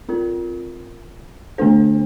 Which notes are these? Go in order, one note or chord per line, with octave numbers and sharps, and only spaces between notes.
C4 F4 A#4
D3 A3 D4 A4 C5